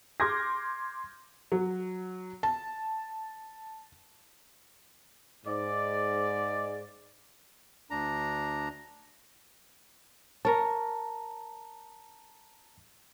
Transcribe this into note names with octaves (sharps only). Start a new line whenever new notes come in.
C6 D6 F6 G6 G#6 A#6
F#3
A5
G#2 D5
D2 D4 A#5
A#4 C#5 A5 A#5